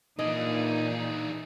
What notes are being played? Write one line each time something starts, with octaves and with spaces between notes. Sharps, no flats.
A#2 E3 D4 D#4 G#4 D#5